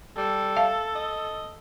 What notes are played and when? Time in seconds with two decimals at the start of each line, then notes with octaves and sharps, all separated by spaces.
0.17 G3 A4
0.57 E5 F5 A5
0.95 D#5